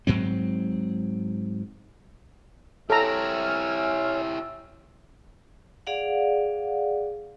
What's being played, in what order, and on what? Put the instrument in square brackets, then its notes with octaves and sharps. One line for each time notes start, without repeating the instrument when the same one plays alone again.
[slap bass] G#2 F#3 C4
[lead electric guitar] E4 G4 [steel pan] A4 A#5 [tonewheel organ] C#5 G#5 F6 [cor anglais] E5
[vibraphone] G#4 D5 F5 F#5